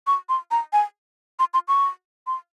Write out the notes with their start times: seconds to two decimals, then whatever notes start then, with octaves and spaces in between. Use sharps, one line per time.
0.07 C#6
0.29 C6
0.51 A#5
0.73 G#5
1.39 C6
1.54 C6
1.68 C#6
2.27 C6